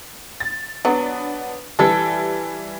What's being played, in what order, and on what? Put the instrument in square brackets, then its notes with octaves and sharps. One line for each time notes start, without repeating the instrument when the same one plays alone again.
[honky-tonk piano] A6
[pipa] F#3 [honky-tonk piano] B3 D4
[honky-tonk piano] E3 G3 [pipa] A4